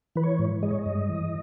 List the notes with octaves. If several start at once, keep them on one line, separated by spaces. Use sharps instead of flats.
E3 B4
C#5
G#2
G#3 D#5
C#5
D#5
G2
E3